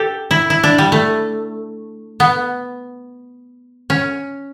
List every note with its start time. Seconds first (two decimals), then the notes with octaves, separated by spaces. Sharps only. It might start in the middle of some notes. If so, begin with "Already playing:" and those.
Already playing: G4 A4
0.31 E4
0.50 E4
0.63 D4
0.78 G3
0.92 A3
2.20 B3
3.90 C#4